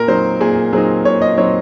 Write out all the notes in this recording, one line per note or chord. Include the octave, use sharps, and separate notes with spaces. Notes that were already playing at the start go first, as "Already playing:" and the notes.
Already playing: A#2 A#4
F#3 C4 D#4 C5
A#2 G#4
F#3 C4 D#4 G#4
A#2 C#5
D#5
F#3 C4 D#4 C#5